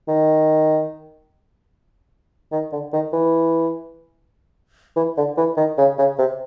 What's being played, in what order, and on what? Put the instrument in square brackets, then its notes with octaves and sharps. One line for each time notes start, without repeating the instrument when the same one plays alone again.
[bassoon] D#3
D#3
D3
D#3
E3
E3
D3
E3
D#3
C#3
C#3
C3